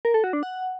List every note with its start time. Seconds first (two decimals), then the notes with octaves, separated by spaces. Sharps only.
0.05 A#4
0.14 A4
0.24 F#4
0.33 D4
0.43 F#5